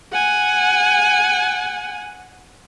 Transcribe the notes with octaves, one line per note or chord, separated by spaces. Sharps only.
F#5 G#5